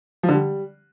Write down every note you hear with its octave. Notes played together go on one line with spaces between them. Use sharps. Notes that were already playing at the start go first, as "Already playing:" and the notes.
F3
D3
G3